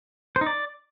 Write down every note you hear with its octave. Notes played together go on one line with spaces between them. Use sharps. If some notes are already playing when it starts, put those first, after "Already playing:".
C5
D#4
D5